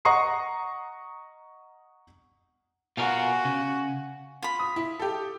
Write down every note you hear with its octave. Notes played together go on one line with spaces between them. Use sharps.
D#5 F#5 A#5 C#6 D#6 C7
B2 F4 F#4 A#4 F5 G#5
C#3
F4 B5
D#6
E4
G4 A4